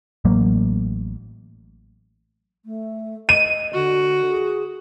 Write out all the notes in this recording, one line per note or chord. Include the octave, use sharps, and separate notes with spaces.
A1 F#3 A#3
A3
D#5 D#7
D3 F#4
G#4